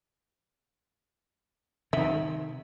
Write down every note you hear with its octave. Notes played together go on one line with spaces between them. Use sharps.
C3 D#3 E5